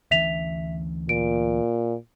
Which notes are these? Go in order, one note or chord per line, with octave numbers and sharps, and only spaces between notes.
D2 E3 C#4 E5 B6 F7
A#2 D7